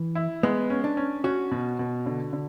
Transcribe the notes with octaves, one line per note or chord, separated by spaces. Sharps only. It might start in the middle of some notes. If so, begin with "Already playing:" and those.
Already playing: E3
E4
G#3 B3
C#4
D4
C#4
C#4 F#4
B2
B2
D3
D3